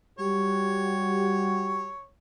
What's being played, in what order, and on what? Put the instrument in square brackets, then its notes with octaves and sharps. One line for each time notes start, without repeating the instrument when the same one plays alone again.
[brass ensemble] G3 F#4 G4 [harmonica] C#5